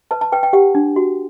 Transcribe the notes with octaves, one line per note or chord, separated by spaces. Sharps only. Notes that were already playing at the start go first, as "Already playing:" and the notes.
B4 A5
A5
B4 G5
G5
G4 F#5
D4
F#4